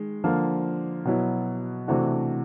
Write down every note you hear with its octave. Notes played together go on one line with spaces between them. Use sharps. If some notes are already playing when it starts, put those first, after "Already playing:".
Already playing: D#3 G#3
D3 F3 A#3
B2 F#3 B3 E4
C3 E3 A3 D4 F#4